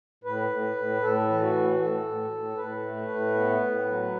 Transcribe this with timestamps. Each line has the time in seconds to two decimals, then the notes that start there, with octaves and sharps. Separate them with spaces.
0.24 A2 B4
0.50 A2
0.76 A2
1.02 A2 A4
1.28 E3
1.41 F#4
1.54 A2
1.79 A2 A4
2.05 A2
2.31 A2
2.57 A2 B4
2.82 A3
3.08 A2
3.35 B3
3.60 A2
3.86 F#3